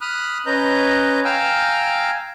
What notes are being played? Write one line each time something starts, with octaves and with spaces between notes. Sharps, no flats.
B5 D#6 F6 F#6
C#4 B4 D#5 A#5 G6
F5 G5 G#5 A#5 E6 F6